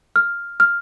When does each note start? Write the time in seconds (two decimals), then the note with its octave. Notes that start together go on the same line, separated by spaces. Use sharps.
0.16 F6
0.60 F6